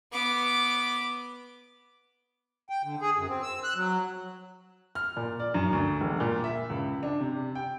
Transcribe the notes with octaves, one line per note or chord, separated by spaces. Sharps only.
B3 D6
G5
D3
G#4
F#2
C4
E6
F#6
F#3
F6
A#2
D5
F#2
D2
E1
A#2
E5
C#2
D4
C3
G5